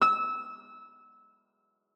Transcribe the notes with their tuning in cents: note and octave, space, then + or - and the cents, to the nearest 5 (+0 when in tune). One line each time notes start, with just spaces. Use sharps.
E6 -20